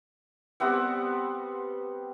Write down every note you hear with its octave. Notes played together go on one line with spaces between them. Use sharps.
G3 B3 C4 F#5